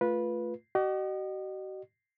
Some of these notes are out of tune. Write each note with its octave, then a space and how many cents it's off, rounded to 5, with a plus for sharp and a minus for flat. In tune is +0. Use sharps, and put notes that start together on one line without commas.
A3 +0 F4 +0 B4 -15
F#4 +45 D#5 -35